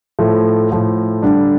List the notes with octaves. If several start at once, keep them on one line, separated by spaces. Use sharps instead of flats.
A2 F3 A3
A2 F3 A3
D3 G3 D4